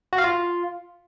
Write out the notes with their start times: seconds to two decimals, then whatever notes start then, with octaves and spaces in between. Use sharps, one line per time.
0.13 F#4
0.18 F5
0.24 F4